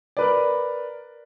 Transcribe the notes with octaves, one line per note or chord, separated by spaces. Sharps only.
A#4 B4 D5